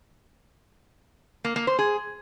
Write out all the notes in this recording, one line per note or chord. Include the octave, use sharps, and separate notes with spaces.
A#3
A#3
C5
G#4